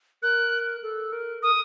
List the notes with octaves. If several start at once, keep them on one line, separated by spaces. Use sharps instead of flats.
A#4 F#6
A4
A#4
A#4 D#6